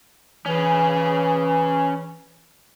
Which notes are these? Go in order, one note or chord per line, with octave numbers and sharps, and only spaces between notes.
E3 C#4 G#4